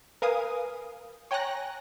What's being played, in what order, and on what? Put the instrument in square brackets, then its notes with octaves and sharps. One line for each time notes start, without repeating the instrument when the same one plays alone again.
[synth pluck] A#4 B4 F5 G#5 D#6
C#5 G5 G#5 A#5 F#6 A#6